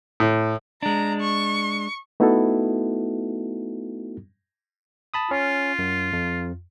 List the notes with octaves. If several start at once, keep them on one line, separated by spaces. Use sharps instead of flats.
A2
G#3 D4 A#5
C#6
A3 B3 D#4 E4 F#4 A4
A5 B5 D#6
C#4 F4
F#2
F2